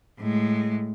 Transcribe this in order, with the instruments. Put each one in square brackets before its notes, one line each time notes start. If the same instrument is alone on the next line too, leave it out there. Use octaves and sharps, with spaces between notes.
[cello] A2 G#3